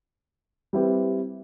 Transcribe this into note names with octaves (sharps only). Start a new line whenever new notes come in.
G3 C4 E4 G4 B4